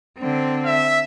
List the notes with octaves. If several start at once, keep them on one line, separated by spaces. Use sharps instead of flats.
D3 C4
E5